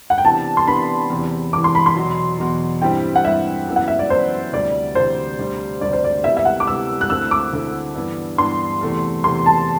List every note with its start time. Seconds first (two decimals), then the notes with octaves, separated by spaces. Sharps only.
0.10 F#5
0.18 G5
0.24 C3 E3 B3 D4 A5
0.57 C6
0.67 C3 E3 B3 D4 B5
1.10 E2 C3 E3
1.53 E2 C3 E3 D6
1.64 C6
1.75 B5
1.86 C6
1.96 E2 B2 F#3
2.39 E2 B2 F#3
2.82 G2 E3 G3 C4 E4 G5
3.16 F#5
3.25 G2 E3 G3 C4 E4 E5
3.67 F#2 E3 B3 E4
3.76 F#5
3.88 E5
3.99 D5
4.10 F#2 E3 B3 E4 C5
4.53 D2 C3 E3 G3 D5
4.95 D2 C3 E3 G3 C5
5.39 D2 C3 G3 D4
5.81 D2 C3 G3 D4 D5
5.93 C5
6.04 D5
6.24 C3 G3 B3 E4 E5
6.37 E5
6.45 F#5
6.60 D6
6.67 C3 G3 B3 E4 E6
7.01 F#6
7.10 D2 D3 A3 C4 E4 E6
7.31 D6
7.53 D2 D3 A3 C4 E4
7.96 G2 E3 B3 D4
8.38 G2 E3 B3 D4 C6
8.81 E2 C3 E3 A3
9.24 E2 C3 E3 A3 C6
9.46 A5